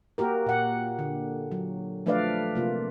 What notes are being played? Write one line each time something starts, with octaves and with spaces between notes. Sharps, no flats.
A#3 F#4 G4 A#4
A#2 F#5
D3
F#3
F3 A3 D4 B4 D5 F5
C3 A#3 F4